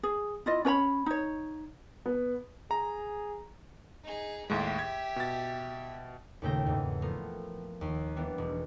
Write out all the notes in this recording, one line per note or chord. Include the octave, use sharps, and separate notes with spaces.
G#4
E4 F4 D#5
C#4 B4 C#5 B5
D#4 C#5
B3
G#4 A#5
D#4 G#4
D#2 A2 G#3 G4 E5
G#6
B2 A6
D#2 A#2 C#3 A3 G5 A#6
E2 G#2
F3 A3 B3 A#4
D#2
E3 G3 B3 D4
E1